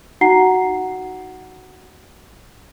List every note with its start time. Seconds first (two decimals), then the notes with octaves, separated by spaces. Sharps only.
0.21 D#4 F#4 F#5 A#5 C7